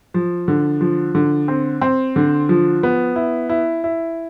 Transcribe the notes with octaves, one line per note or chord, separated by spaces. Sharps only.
F3
D3
F3
D3
C4
C4
D3
F3
B3
E4
E4
E4